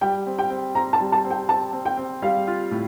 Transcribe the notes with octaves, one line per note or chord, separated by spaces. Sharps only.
G3 G5
C4
G5
C4
C4 A#5
A5
G3
A5
C4
G5
C4 A5
C4
G5
C4
G3 F5
F4
A2